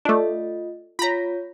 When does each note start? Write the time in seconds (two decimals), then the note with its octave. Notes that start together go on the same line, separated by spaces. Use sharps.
0.05 A3 D4 F4 D#5
0.99 F4 C#5 A#5 B5